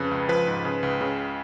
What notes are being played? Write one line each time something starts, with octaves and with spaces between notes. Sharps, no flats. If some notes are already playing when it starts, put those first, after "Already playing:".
Already playing: F2 C#3 B4
C#2
F3 B4
G#2
C#3
C#2
C#3